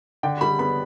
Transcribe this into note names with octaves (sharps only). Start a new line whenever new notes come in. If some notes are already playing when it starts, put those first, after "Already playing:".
D3 G5
G3 B5
B3 B5